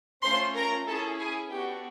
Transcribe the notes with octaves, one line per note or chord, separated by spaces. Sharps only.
A3 C#4 F4 C5 C6
A#4 A#5
C#4 E4 G#4 A4 A5
G#4 G#5
B3 D4 F#4 G4 A4 G5